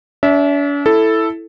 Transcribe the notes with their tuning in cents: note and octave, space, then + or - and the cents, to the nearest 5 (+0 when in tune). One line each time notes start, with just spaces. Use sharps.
D4 -45 E5 -10
E4 +0 A4 +0